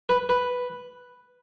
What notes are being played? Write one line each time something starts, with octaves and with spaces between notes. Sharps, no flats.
B4
B4